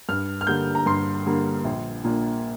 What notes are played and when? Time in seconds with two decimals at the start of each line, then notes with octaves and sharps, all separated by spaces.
0.09 G2 F6
0.41 F6
0.47 D3 G3 A#3 G6
0.75 A#5
0.86 G2 C6
1.26 D3 G3 A#3
1.65 A#1
2.04 A#2 A#3 D4